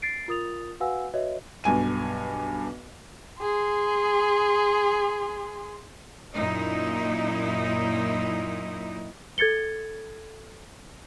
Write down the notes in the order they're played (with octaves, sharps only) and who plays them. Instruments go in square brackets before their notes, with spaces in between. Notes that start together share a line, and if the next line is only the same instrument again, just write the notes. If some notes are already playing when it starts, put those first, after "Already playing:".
[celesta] A6 C7 D7
F4 A#4 D#6 A6 F7
F#4 B4 F5 F#5 G#5 E6
F#4 B4 C#5 D#5 E5
[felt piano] B1 G2 G#5 D#7
[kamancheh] G#4 C6
[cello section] F#2 A#2 D#4 E4
[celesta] A4 G#6 A6 C#7 G7